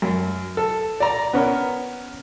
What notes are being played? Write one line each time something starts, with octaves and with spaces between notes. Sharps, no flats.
F#2
A4
D5 A#5
B3 C#4 A#4